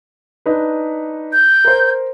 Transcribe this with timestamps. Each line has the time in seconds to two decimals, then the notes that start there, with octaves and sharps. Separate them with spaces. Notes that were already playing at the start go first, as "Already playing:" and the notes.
0.46 D4 D#4 B4
1.33 G6
1.64 A#4 C5